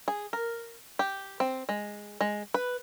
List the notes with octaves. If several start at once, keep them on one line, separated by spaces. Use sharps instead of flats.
G#4
A#4
G4
C4
G#3
G#3
B4